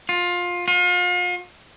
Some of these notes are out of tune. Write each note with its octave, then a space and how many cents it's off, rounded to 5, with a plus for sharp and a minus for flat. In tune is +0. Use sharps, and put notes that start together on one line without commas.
F4 +20
F4 +40